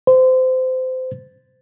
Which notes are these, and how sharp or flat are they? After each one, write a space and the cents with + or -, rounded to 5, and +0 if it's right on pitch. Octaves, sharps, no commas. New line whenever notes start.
C5 -25